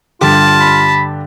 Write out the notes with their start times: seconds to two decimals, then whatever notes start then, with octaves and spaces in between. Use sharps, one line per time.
0.21 G2 D3 F4 G4 A5
0.60 B5